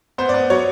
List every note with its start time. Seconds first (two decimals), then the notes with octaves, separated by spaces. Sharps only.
0.18 B3 C5
0.29 D5
0.34 B3
0.50 F#3 C#5